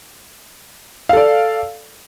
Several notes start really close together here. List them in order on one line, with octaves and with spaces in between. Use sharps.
F5 A4 D5